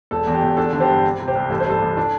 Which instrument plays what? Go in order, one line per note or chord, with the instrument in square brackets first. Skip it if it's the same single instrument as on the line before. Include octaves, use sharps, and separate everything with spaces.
[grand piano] E1 A4
E2
G4
E1
D4 A4
D3
G4 C5
G2
C4
C3
G4 C5
C2
A1 A4
C5
G2 A4
A1
D4